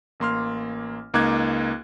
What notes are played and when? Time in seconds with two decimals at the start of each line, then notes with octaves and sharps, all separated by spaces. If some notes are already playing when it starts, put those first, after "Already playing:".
0.20 A1 A#3 C6 F6
1.14 C#2 A#3 D#4 D6 F#6 G#6